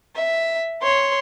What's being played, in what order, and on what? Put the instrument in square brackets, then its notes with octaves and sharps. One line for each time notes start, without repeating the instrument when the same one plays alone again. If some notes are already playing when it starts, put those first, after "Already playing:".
[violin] E5
C#5 C6